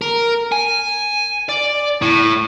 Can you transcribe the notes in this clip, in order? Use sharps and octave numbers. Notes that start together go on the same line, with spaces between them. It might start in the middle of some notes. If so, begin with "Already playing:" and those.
A#4
G#5
D5
A2